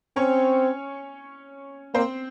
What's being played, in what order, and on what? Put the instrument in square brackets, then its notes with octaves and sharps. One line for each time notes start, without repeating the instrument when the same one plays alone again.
[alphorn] C4 [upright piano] C#4 C#5
[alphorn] A#3 [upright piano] C4 C5